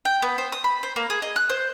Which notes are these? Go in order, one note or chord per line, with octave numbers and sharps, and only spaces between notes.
G5
B3
C5
D#6
B5
C5
A#3
G#4
D#5
F#6
C5